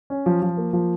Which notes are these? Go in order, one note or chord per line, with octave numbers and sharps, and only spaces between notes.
C#4
F3
F3
A#3
F3